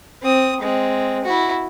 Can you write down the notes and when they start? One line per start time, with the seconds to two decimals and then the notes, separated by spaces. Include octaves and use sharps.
0.22 C4 D#6
0.60 G#3 C4
1.24 E4 F#4